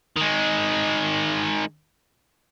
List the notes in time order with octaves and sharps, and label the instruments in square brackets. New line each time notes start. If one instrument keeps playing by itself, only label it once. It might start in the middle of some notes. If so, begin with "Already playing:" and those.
[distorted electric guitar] D#3 G#3